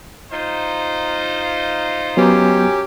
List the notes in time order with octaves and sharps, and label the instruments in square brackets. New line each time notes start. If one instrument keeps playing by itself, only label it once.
[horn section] D#4 F4 C5
[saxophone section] F#2 C#4 G4 [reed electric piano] F#3 B3